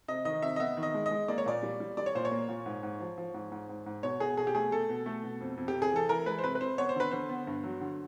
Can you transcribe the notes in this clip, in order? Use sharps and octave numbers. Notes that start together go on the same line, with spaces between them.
C3 D#5
D#3 D#5
C3 E5
D#5
B3 E5
D#3
D#5
G#3
D#5
G#3
A#3 D5
C#5
A#2 D5
G3
G3
G3 D5
C#5
A#2 C5
C#5
A#3
A#2
G#2
G#2
F3
F3
G#2
G#2
G#2
G#2
B2 C#5
B2 G#4
B2 G#4
G4
A3 G#4
A3 A4
B2
A3
B2
F2
F2
G4
C3
G#4
E3 A4
E3 A#4
G#3 B4
C5
C3 B4
B4
C3 C5
B3 C#5
C5
D3 B4
D3 C5
B3
G2
F#3
D3